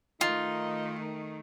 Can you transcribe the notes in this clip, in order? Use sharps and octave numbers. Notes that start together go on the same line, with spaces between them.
D#3 A3 D#4 F4